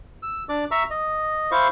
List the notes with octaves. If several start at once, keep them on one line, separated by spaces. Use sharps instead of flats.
E6
D4 D5 D6
E5 A#5 C#6 E6
D#5
E4 C5 F5 C#6